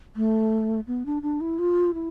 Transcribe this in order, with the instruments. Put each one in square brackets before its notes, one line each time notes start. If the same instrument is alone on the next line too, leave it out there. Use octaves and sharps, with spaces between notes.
[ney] A3
B3
D4
D4
E4
F4
E4